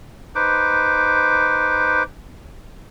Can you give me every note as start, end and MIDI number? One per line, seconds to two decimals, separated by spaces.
0.35 2.03 63
0.35 2.03 71
0.35 2.03 72
0.35 2.03 86